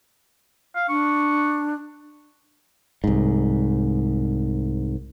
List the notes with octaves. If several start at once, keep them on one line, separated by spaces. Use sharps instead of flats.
F5
D4 C#6
C2 G#2